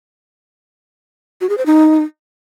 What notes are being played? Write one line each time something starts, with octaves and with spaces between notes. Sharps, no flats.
F#4
G#4
C5
D#4